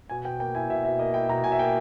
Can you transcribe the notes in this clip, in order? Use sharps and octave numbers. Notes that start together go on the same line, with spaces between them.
B2 G#5
B2 G5
A#3 G5
E4 G#5
B2 E5
B2 E5
A#3 D#5
E4 G5
B2 A#5
B2 G#5
E5
A#3 G5